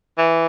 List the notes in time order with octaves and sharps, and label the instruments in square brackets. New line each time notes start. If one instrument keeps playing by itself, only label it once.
[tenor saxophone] E3